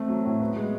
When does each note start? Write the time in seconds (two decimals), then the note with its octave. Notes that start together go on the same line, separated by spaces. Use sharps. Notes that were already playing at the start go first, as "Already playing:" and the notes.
Already playing: A3 C4
0.08 F#3
0.25 A2
0.41 B3
0.56 G#3